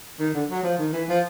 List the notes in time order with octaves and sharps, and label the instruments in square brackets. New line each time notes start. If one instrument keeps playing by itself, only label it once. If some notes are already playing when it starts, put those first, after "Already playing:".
[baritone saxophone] D#3
D3
F#3
F3
D#3
E3
F3